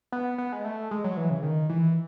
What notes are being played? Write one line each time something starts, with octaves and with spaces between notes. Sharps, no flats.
B3
B3
G#3
A3
G#3
F#3
E3
C#3
D#3
E3